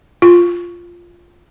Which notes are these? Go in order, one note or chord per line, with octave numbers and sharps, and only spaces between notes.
F4